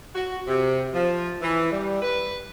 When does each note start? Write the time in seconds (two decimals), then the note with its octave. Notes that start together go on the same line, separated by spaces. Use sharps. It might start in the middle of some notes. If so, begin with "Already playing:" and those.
0.15 F#4
0.48 C3
0.93 F3
1.42 E3
1.71 G3
2.02 B4